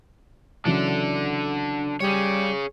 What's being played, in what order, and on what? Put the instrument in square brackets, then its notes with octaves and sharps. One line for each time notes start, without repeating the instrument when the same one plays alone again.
[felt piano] C#3 E3 F#3 [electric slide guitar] D4 A4 D5
[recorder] G3 [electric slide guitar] G#4 C#5